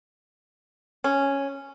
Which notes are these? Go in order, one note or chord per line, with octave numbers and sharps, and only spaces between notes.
C#4